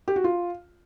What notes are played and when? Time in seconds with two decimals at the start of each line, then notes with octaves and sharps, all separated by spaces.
0.08 G4
0.16 F#4
0.24 F4